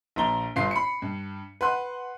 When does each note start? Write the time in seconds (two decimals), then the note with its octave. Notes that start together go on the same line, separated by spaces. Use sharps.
0.16 A#1 A#2 A#5 G7
0.56 G1 G2 F4 C7
0.71 B5 C#7
1.02 G2
1.61 B4 F#5 C6 F#6